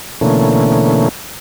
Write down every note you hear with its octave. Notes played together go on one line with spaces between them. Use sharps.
B2 D3 E3 A3 A#3 C#4